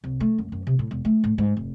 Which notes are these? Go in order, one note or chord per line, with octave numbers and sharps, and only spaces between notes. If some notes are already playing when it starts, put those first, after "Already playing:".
C2
A3
F#2
F#2
C3
A2
E1
A3
A2
G#2
F1